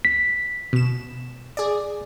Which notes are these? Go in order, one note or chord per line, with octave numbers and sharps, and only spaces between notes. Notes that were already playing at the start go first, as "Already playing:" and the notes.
B6
B2 E7
G#4 D5